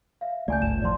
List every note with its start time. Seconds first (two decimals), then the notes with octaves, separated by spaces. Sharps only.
0.21 E5 F5
0.48 C#2 A3 D5 G#5 G6
0.62 G1 E7
0.82 E2 A2 F3 D5 C6